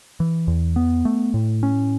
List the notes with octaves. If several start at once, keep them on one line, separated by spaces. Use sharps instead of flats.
E3
E2
B3
A3
A2
C#4